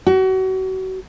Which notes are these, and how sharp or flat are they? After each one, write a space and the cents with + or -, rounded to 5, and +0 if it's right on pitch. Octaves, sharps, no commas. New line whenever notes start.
F#4 +30